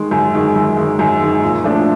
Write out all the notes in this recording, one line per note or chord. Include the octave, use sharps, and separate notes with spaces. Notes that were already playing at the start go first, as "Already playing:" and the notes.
Already playing: D#3 G#3
F#2
D#3 G#3
F#2
D#3 G#3
F#2
D#3 G#3
A#2
F3 A3 D4